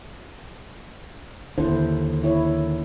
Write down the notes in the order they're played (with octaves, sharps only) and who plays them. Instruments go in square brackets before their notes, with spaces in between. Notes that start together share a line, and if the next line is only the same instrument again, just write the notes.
[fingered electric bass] D#2 D3 [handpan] E4 C5
[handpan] E4 C#5